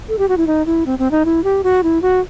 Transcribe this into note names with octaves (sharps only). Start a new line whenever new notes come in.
A4
G4
F#4
E4
D#4
E4
C4
C4
D#4
E4
G4
F#4
E4
F#4